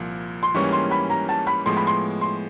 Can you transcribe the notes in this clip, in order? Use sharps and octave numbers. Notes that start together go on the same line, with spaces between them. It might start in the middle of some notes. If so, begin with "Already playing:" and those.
Already playing: C2 A#2 F3
C6
G#2 E3 G3 A#3 C#4 C#6
C6
B5
A#5
A5
B5
A2 F3 G#3 B3 C6
B5
C6
C6